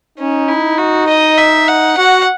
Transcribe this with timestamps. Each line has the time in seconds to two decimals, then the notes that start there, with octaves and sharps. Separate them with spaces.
0.18 C#4 D#4
0.48 E4
0.78 F#4
1.08 D#5
1.37 E5
1.68 F#5
1.97 F#4 F#5